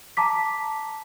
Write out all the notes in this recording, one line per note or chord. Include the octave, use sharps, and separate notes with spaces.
A5 A#5 D6 B6